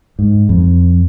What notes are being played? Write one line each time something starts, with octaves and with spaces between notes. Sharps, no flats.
G#2
F2